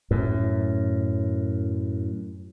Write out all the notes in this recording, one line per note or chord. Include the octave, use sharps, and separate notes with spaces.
F#2 A2